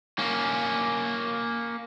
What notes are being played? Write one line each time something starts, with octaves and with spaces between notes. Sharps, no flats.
A#3 C#4